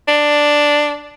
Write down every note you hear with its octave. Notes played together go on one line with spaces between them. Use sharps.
D4